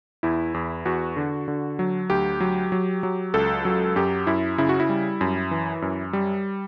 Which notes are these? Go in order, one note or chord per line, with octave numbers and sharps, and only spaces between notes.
E2 E4
E2
E2 F#4
D3
D3
F#3
D2 G4
F#3
F#3
F#3
C#2 A4
F#3
F#2 G4
F#2 E4
C#3 E4
F#4
E4
G3
F#2
E3
F#2
G3